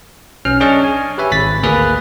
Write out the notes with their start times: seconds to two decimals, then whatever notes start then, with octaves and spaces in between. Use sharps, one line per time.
0.45 B1 C#4 F6
0.60 C#4 D4 G#4 D#5 A5 C#6
0.84 G#5
1.18 G4 B4 C#5 E5 G#5
1.32 G#1 B5 A6 B6
1.63 D2 A#3 G#4 B4 F#6